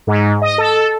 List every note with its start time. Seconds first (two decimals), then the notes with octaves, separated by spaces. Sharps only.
0.07 G#2
0.42 D#5
0.58 A4